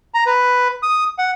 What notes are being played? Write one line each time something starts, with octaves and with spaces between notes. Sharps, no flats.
A#5
B4
D#6
F#5